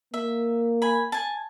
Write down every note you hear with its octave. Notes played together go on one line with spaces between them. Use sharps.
A#3 E5
G#5 B5
G#5 A5